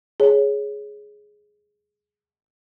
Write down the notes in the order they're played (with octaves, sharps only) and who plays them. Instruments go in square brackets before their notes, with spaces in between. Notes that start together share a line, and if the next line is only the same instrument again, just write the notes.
[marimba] G#4 C#5